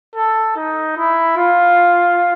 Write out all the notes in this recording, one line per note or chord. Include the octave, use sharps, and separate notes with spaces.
A4
D#4
E4
F4